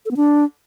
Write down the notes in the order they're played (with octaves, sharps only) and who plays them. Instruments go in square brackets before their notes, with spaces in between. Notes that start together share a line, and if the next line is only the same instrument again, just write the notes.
[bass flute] A4
B3
D4